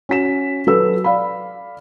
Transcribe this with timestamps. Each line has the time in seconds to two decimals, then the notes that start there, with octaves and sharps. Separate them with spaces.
0.09 C#4 F#4 B6 E7
0.67 F#3 A4 B4 E6
1.04 D5 F5 B5